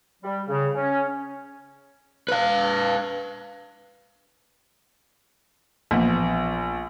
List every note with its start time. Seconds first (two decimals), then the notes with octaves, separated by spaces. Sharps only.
0.23 G3
0.48 C#3
0.75 C#4
2.28 B4 F5
5.91 A#1 E3 A#3 B3